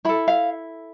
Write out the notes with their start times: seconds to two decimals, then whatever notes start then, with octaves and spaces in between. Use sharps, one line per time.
0.05 E4 A4 B5
0.28 F5